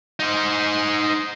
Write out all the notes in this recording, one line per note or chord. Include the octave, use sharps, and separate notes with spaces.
D#4 C5